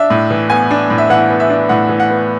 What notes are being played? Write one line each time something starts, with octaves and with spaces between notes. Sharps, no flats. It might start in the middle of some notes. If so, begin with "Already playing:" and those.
Already playing: D4 E5
A2
E3
B3 G#5
D4
A2
E5
E3 F#5
B3
E5
D4
A2 F#5
E3
F#5
B3